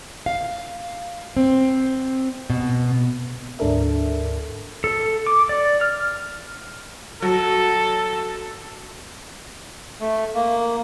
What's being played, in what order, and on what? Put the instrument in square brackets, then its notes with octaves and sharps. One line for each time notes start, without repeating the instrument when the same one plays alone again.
[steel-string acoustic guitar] F5
C4
B2
[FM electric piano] D2 G#2 D4 A4 A#4 E5
[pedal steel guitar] A4
D6
D5
F6
[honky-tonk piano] F#3 [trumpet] A4
[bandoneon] A3
A#3